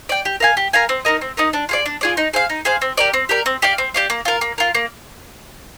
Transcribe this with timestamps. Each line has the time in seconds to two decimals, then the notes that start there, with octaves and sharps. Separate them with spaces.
0.09 D5 G5
0.25 G4
0.40 A#4 F5 G#5
0.57 G4
0.73 A#4 F5 G#5
0.89 C4
1.05 D#4 A#4 D#5
1.21 C4
1.37 D#4 A#4 D#5
1.53 D4
1.69 F4 G#4 D5
1.86 D4
2.01 F4 G#4 D5
2.17 D#4
2.33 G#4 C5 F5
2.50 D#4
2.65 G#4 C5 F5
2.82 C4
2.97 G4 A#4 D5
3.14 C4
3.29 G4 A#4 D5
3.46 C4
3.62 G4 D5 F5
3.78 C4
3.94 G4 D5 F5
4.10 A#3
4.25 F4 A#4
4.41 A#3
4.58 F4 A#4
4.75 A#3